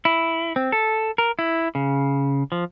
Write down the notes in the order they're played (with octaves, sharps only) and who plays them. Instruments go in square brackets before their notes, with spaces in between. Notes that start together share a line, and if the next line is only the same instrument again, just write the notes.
[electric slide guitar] E4
C4
A4
A#4
E4
C#3
F3